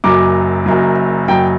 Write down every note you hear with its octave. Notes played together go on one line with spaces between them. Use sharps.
F#1 F#2 F#3 D6
F#1 F#2 F#3
F#1 F#2 F#3 G5